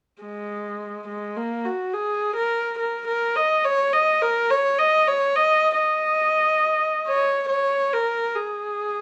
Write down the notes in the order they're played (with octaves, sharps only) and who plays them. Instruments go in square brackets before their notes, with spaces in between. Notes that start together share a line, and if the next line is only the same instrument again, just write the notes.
[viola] G#3
G#3
A#3
F#4
G#4
A#4
A#4
A#4
D#5
C#5
D#5
A#4
C#5
D#5
C#5
D#5
D#5
C#5
C#5
A#4
G#4